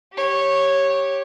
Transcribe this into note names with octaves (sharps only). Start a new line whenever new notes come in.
G4 C#5